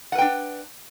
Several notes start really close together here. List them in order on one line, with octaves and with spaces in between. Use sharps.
F#5 B4 G5 D4